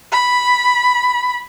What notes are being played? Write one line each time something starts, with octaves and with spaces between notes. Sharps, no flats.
B5